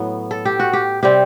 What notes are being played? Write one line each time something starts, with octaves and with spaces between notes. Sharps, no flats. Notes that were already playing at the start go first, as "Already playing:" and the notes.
Already playing: A2 F#3 B3
A4
G4
F#4
G4
C3 G3 C4 G4